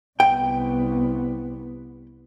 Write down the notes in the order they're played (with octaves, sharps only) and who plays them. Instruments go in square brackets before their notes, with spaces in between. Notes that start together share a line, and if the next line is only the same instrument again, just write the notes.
[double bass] C2 B3 [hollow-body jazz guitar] G5